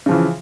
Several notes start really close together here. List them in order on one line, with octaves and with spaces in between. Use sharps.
C#3 F3 E3